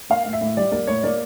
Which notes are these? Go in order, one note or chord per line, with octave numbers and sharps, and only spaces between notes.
A#3 F5
A2
E5
A2
G3 D5
A#3 D5
A2 C#5
A#3 D5